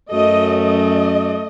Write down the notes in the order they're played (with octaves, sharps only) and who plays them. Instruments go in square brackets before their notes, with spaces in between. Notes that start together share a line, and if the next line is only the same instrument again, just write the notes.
[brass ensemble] F#2 [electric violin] A3 [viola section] D#5
[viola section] D#5